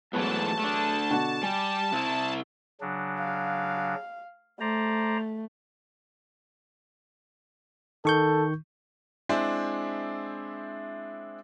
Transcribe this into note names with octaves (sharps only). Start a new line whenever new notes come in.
E2 G#2 E3 F#3 A3 B3 A5
A3 D4
B2 D3 F#4
G3 G#5
C3 E4
C#3 F#3 D4
F5
A3 C5 D5 A#5
D#3 A4 C#6 G6
G#3 C4 D4 E4 C5